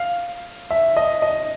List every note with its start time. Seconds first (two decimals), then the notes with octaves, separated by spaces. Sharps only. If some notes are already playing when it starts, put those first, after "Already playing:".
Already playing: F5
0.71 E5
0.97 D#5
1.22 D#5